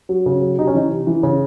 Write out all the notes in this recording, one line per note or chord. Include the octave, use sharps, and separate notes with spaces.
F#3
C#3
F#3
C3 D#4
C#4
E3 D#4
C3
E3
C#3